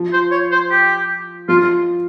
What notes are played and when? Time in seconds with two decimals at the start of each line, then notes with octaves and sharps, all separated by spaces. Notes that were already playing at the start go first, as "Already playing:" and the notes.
Already playing: F3
0.13 C5
0.32 C#5
0.52 C5
0.71 G4
1.48 F3 F4